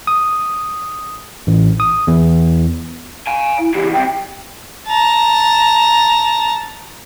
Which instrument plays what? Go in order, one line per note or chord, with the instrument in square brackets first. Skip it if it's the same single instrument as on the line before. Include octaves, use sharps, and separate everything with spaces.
[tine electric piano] D#6
A1
D#6
E2
[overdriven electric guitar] F5 G#5
[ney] E4
[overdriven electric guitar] C#2 E3 [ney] G4
[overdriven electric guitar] C2 C3 [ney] G5
[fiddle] A5 A#5